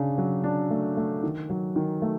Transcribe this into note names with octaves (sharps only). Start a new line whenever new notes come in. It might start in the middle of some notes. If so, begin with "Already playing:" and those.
Already playing: C#3 D4
F#3
D4
A3
A3
D#3
F#3
D#3
A3